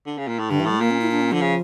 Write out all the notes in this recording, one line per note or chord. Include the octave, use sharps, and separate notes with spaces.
D3
C#3
A#2
A2
G2 D3
E3
A2 G3
A3
A#2 A#3
C#4
E4
D4
C#4
D3 F3
C#3